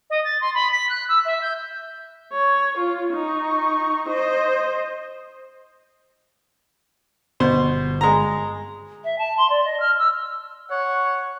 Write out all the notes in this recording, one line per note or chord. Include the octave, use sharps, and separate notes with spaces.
D#5
A6
C6
B5
B6
F#6
E6
E5
G6
C#5
F4
D#4 C#6
C5 D#5
G1 B2 C5
G#3 A#5
E5
A5
C6
D5
D#5
F6
E6
C#5 F#5